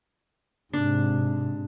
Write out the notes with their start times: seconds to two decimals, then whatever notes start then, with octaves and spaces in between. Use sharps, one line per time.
0.73 G#2 C3 D4